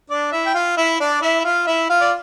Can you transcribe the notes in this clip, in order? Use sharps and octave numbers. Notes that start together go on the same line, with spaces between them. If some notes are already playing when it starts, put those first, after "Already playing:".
D4 D5
E4 E5
G5
F4 F5
E4 E5
D4 D5
E4 E5
E5
F4 F5
E4 E5
F4 F5
D5